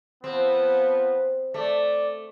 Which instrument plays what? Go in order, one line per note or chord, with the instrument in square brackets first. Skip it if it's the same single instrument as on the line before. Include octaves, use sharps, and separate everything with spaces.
[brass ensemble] F3 B3 [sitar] C4
[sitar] A3 [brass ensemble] D5